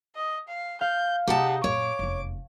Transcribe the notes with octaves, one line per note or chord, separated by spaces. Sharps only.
D#5
F5
F5 G6
C3 D#4 G4 F#5 A5
F#2 A#2 C#5 D6
F1 E2